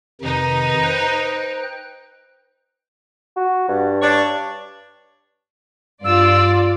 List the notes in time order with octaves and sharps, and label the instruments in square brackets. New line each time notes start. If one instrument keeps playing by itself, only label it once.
[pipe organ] F2 C3 D#3 [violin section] D#4 B4
[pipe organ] C5 G5 F#6
[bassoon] F#4
G2
[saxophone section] D4 C#5
[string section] G2 F4 D5 [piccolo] E6